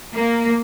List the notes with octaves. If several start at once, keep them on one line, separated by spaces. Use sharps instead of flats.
A#3